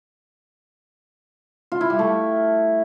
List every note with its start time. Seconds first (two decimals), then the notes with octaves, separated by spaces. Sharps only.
1.72 F4
1.81 E4
1.90 G3
1.99 A3